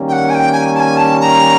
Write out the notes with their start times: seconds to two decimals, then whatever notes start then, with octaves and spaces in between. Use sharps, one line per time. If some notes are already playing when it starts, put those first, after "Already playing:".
Already playing: D#3 G3 A#3 C#4
0.08 G5
0.12 F#5
0.30 G#5
0.35 G5
0.53 G#5
0.75 A5
0.80 G#5
0.97 A5
1.21 A#5